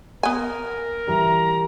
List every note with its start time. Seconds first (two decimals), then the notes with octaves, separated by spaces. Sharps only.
0.23 B3 A#4 G#5
1.07 E3 G3 A#5